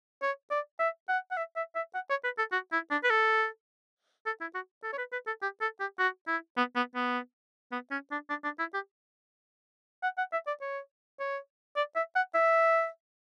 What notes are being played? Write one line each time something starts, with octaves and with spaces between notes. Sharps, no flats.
C#5
D5
E5
F#5
F#5
E5
E5
E5
F#5
C#5
B4
A4
F#4
E4
D4
B4
A4
A4
E4
F#4
A4
C#5
B4
B4
A4
G4
A4
G4
F#4
E4
B3
B3
B3
B3
C#4
D4
D4
D4
E4
G4
F#5
F#5
E5
D5
C#5
C#5
D5
E5
F#5
E5